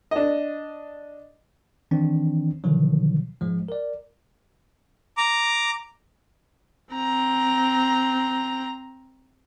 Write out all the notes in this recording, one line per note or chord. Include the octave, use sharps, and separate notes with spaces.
D4 D#5
D#3 E3 C4 D4
B2 D3 D#3 F3 F#3
G#2 F3 G#3
A#4 D5
A#5 D6
C4 A#5